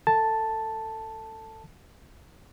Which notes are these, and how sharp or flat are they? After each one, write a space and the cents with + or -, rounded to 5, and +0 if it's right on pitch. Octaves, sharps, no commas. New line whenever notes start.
A4 +25 A5 +0